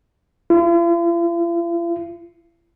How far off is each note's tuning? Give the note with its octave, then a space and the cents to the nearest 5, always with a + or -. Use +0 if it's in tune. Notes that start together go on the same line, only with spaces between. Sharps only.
F4 -45